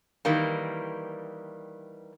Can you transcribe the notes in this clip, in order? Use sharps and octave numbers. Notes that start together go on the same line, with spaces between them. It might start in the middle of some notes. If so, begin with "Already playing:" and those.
D#3 E3 G3 A#3